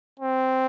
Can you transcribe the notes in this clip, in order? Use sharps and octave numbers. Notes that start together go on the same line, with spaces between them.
C4